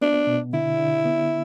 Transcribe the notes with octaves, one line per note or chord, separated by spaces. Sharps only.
B3 D4
B2
D3 E4
D3
B3